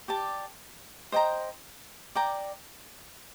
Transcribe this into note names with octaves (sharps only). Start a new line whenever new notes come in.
G4 D5 A5
C5 D#5 G5 A#5
D5 G5 A#5